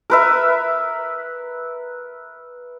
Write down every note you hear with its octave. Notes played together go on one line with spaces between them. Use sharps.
A#4 B4 E5